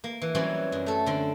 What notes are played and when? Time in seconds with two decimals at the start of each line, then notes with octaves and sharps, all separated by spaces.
0.04 A#3
0.22 E3
0.35 E3 F#3 G3 C4 C#4
0.72 F#2
0.86 A3 A4
1.06 D3 C4